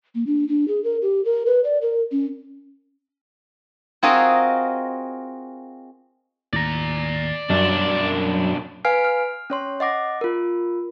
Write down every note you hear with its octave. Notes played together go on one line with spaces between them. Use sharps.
A#3
D4
D4
G#4
A#4
G4
A#4
B4
D5
A#4
C#4
C4 F4 F#4 G#4 A#4 D#5
D#2 A2 D5 A#5
B1 F#2 F#3 G3 D4
B4 F5 G#5 F6 C7 D7
F6
C#4 C#5 C6
D#5 F#5 D6 A#6
F4 A#4